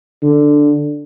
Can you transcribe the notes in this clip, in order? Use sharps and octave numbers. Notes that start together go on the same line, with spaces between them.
D3